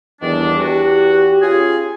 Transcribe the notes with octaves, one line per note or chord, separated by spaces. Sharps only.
E2 D#3 G3 D4
E2 F#4 G4
C#4 F4 G#4